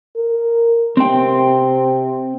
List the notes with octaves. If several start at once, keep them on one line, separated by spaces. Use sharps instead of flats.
A#4
C3 C4 G5